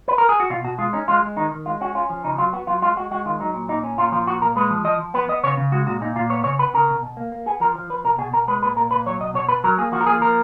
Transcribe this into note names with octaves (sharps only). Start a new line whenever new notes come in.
B4
A#4
G#4
F#4
B2 F4
B2 F#4
G#3 F4
C#4 D#4
G#3 F4
G#3
D#3 D#4
D#3
G#3 F4
C#4 F#4
C#4 F4
F3
C#3 D#4
F#3 F4
B3 F#4
F#3 F4
G#3 F4
G#3 F#4
G#3 F#4
D#3 F4
F#3 D#4
A#2
A#2 D#4
C#4
A#2 F4
F3 F4
A#2 F#4
A#2 A#4
G#3 B4
F3
F3 D#5
F3
B3 B4
B3 D#5
C#3 C#5
C#3
G#3 F#4
A#2 F#4
A#2 D#4
A#2 F4
B3 C#5
C#3 C#5
B3 B4
C#3 A#4
B2
B2
A#3
A#3
B3 G#4
F3 A#4
F3
F3 B4
B2 A#4
B2 G#4
B2 A#4
G#3 B4
A#2 B4
A#2 A#4
A#2 B4
F#3 C#5
B2 D#5
B2 C#5
B2 B4
F#3 A#4
A#3 G#4
F3 F#4
A#4
A#3 G#4
F3 A#4